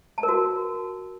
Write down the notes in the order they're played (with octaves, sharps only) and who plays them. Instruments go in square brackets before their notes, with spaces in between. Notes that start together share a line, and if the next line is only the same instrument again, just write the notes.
[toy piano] A5
A#4
F#4